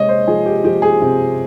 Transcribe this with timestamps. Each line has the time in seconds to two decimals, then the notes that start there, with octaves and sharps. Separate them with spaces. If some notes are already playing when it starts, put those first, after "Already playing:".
Already playing: C3 G#3 C#5 D#5
0.09 C5
0.27 F3 G#4
0.46 G4
0.64 F3 G4
0.82 G#4
1.01 C3